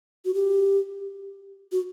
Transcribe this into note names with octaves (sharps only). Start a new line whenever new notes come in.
F#4
G4
F#4